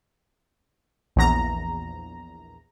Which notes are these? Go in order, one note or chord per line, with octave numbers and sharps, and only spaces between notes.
A#1 E2 A#5